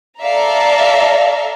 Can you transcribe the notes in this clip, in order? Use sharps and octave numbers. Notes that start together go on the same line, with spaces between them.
A4 D5 E5 F5 A#5